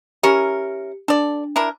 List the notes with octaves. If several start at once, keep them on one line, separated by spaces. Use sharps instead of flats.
C#4 E4 G4 A#4 C#7
D4 A4 D5
D4 E4 A#4